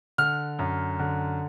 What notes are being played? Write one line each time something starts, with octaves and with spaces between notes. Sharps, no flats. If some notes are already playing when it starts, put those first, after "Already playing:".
D3 F6
F#2
D3